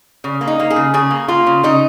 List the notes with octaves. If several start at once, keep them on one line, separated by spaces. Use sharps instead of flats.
C#3
A#3
D#4
A#3
G#4
C#3
C#3 G#4
A#3
A#3 F4
C#3
C#3 D#4